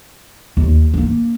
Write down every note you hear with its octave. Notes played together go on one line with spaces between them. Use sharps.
D#2
A#3 D4